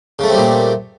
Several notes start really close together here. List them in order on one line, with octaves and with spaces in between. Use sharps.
C#3 A3 C4 G3 A#2